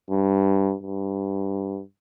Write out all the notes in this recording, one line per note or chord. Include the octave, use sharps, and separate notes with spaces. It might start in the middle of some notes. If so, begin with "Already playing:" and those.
G2
G2